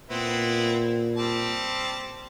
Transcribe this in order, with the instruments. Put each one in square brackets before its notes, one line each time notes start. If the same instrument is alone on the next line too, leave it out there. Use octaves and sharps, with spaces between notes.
[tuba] A#2 [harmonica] B3 C4 E4
[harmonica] G3 C4 A5